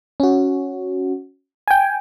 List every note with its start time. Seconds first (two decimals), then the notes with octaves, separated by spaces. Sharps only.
0.20 C#4 F#4
1.68 G5 G#5